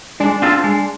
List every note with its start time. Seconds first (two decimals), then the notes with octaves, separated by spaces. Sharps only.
0.20 G#3 D4
0.42 C4 F4 A4
0.64 G#3